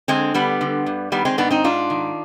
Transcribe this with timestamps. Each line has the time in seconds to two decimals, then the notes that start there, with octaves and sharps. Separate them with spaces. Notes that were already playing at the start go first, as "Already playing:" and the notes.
0.08 D3 G#3 C4
0.34 D3 G3 B3
0.61 D3
0.86 G2
1.12 D#3 G3 B3
1.25 G#3 C4
1.38 G#2 B3 D4
1.51 C4 D#4
1.64 G#2 D4 F4
1.90 D#3